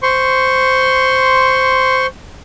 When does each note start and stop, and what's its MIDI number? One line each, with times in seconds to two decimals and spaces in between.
0.03 2.06 72
0.03 2.06 84
0.03 2.06 85